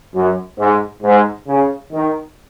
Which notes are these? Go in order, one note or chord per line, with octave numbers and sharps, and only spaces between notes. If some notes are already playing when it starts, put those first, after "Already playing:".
F#2
G#2
G#2
C#3
D#3